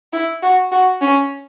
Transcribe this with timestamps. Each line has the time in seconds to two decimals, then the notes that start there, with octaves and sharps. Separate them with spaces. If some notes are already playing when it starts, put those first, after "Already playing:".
0.13 E4
0.43 F#4
0.71 F#4
1.01 C#4